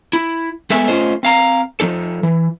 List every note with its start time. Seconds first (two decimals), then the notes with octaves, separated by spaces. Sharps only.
0.13 E4
0.70 G#3 A3 B3 A4 E5 G#5
0.87 A3 C#4 F4 C5 D#5
1.23 C4 F5 A#5
1.80 F3 G3 D#4 A4
2.23 E3